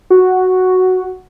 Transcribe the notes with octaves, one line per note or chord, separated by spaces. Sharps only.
F#4